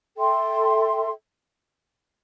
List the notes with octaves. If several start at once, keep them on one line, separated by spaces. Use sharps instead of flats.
A4 E5 G5 C6